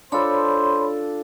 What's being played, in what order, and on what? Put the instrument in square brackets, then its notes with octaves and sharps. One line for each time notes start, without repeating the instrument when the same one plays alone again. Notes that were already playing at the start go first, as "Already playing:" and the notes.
[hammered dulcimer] D4 F4 A4 [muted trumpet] C5 [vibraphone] C#5 B5 C6